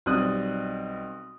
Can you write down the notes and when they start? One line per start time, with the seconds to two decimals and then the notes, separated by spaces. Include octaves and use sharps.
0.06 B1 G3 C4 D#6 F#6